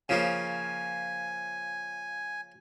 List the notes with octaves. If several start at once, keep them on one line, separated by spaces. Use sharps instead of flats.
C#3 F3 A#3 G#5